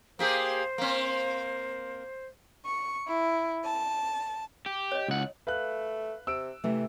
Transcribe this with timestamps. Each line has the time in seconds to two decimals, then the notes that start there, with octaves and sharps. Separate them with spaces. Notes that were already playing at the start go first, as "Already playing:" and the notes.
0.19 A#3 G4 G#4 C5
0.78 A#3 C4
2.65 C#6
3.07 E4
3.63 A5
4.66 G4
4.92 C#5 D#5
5.08 C#2 F#5
5.47 A3 B4 F5 F#6
6.27 C3 E6 D7
6.64 C3 E3 A3